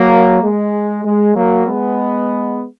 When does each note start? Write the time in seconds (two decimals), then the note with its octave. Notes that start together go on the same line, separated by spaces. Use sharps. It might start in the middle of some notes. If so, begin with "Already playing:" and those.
Already playing: F#3 A#3
0.42 G#3
1.05 G#3
1.35 F#3 A#3
1.67 G#3 B3